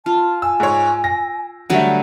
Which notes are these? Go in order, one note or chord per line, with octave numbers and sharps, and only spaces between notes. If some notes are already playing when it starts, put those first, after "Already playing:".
F4 A5
G#5 E6
G#2 C#5
A#6
D3 F#3 G3 A3 F#5